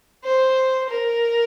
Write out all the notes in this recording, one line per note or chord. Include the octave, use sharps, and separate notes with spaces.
C5
A#4